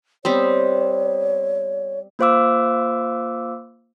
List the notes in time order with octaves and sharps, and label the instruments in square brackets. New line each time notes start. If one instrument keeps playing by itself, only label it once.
[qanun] G3 B3 C4 [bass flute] C#5
[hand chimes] A#3 F4 C5 F5 D6 E6